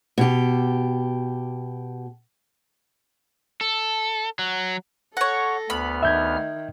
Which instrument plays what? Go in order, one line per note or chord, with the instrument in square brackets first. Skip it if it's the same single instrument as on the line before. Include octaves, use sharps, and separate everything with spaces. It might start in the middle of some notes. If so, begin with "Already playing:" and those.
[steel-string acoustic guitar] B2 G4
[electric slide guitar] A4
F#3
[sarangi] A4 [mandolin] C#5 F#5 [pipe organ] A#6
[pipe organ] D2 B3 F6 [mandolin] B5
[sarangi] D#3 [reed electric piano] E5 G6 G#6